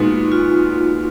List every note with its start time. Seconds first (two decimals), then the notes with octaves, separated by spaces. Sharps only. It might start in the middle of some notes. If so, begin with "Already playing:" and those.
Already playing: A#2 G#3 B3 D#4 F#4
0.32 F4